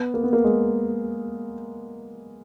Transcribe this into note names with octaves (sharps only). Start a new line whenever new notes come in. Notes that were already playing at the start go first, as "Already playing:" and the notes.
Already playing: B3
A#3
B3
A#3
G#3